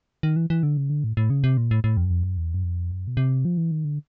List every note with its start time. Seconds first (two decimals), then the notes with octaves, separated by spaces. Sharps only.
0.23 D#3
0.36 E3
0.50 E3
0.63 D3
0.77 C#3
0.90 D3
1.04 A2
1.17 A2
1.30 C#3
1.44 C3
1.57 A#2
1.71 A2
1.84 A2
1.97 F2
2.05 F#2
2.10 F2
2.23 F#2
2.37 E2
2.54 F#2
2.64 F2
2.91 F#2
3.07 B2
3.17 C3
3.45 F3
3.57 E3
3.71 D#3
3.85 D3